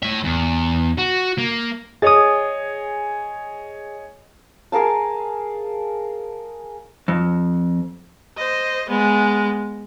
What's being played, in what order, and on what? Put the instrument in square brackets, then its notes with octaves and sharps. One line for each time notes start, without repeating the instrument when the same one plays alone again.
[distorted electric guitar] A2 E5
E2
F#4
A#3
[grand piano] G#4 [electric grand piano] C#5 D#5 G#5 [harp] D#6 A6
[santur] G#4 A#4 F5 A5
[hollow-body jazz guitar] F2
[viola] C5 D#5
G#3 B3